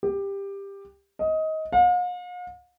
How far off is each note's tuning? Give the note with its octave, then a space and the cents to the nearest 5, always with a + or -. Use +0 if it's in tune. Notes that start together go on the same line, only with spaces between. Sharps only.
G4 +15
D#5 +20
F5 +45